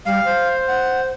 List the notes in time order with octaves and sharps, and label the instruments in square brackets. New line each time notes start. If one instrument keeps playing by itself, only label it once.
[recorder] G3 [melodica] F5
[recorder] C5
[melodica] F#5